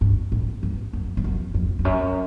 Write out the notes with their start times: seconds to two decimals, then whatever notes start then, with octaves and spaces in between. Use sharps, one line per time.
0.01 G2
0.32 A2
0.63 G2
0.93 F#2
1.17 G2
1.24 F#2
1.54 F2
1.79 F2
1.85 F#2